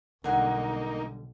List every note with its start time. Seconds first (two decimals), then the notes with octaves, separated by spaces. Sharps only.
0.24 B1 D3 G3 A#3 D#4 F#5 G#5